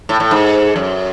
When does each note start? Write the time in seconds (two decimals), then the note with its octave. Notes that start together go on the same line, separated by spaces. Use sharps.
0.09 A2
0.20 A2
0.31 G#2
0.76 F#2